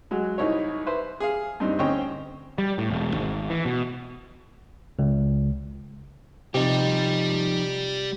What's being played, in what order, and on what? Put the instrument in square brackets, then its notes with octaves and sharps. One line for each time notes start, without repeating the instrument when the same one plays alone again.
[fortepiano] F#3 G#3 F#4
C2 D#4 E4 C#5
B4 C5 E5
G#4 F5
G2 C4 D#4
D2 C4 C#4 C#5 D#5 G5
[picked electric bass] G3
A2
E1
G#1
E3
B2
[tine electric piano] C#2
[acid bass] C3 [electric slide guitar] F3 D#4 G4 [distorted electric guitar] G3